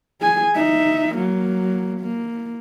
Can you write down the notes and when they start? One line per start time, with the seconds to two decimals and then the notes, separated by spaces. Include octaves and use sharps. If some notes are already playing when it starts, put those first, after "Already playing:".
0.21 G#4 G#5
0.55 D#4 E5
1.16 F#3 A#3
2.01 A#3